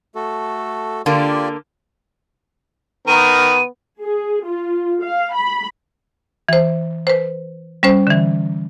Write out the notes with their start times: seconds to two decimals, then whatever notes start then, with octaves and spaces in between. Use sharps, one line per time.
0.15 A3 F#4 A4
1.06 D3 A#3 F4 G4 D5
3.08 D#3 B3 A#4 D#7
4.02 G#4
4.46 F4
5.03 F5
5.34 B5
6.49 E3 C5
7.07 B4 C5
7.83 G3 C#4 C5
8.07 D3 E3